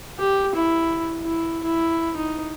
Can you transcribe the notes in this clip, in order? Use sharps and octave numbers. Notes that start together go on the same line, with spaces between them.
G4
E4
E4
E4
D#4